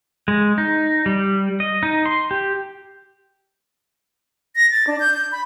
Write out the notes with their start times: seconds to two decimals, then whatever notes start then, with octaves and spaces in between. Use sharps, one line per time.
0.28 G#3
0.58 D#4
1.06 G3
1.60 D#5
1.83 D#4
2.06 C6
2.31 G4
4.56 A#6
4.71 A6
4.87 D4
5.00 G6
5.14 G6
5.32 B5